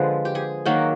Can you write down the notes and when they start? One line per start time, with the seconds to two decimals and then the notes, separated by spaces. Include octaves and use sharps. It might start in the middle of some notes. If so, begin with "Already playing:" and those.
Already playing: D3 F3 G#3 B4
0.25 G4
0.35 G#4
0.65 D#3 F#3 A#3 F#4